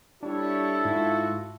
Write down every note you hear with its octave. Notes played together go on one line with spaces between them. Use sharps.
G3 D4 E4 A4 C#5
G#2 F4 F#4